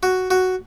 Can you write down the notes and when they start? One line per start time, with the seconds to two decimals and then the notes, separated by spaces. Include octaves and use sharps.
0.03 F#4
0.31 F#4